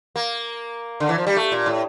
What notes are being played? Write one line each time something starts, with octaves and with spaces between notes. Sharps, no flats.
A#3
D3
E3
F3
G3
A3
A#2
A2